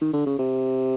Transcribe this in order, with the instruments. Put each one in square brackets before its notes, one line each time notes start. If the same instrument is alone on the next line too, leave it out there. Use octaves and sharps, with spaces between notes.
[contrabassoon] D#3
D3
C#3
C3